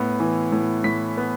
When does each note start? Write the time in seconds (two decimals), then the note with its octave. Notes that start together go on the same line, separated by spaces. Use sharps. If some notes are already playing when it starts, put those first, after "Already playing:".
Already playing: A2 B3
0.20 E3
0.52 A2
0.84 A2 B6
1.17 B3